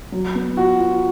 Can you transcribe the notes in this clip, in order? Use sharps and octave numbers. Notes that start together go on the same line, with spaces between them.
F#3
B3
F4 F#4
F4